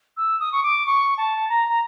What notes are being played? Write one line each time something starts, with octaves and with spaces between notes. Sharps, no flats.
E6
D#6
C#6
D6
C#6
A5
A#5
A#5